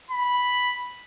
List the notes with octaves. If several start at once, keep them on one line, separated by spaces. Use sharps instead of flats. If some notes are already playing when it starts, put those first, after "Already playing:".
B5